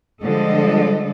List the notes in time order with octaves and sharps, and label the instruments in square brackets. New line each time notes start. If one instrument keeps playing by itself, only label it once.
[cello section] D3 F3 G3 G#3 A4 D#5